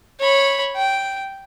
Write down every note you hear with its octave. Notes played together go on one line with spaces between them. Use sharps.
C#5 B5
G5